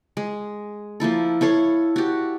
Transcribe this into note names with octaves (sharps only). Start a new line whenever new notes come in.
G#3
F3 A#3 E4 A4
E4 A4 C#5 F5
F#4 G4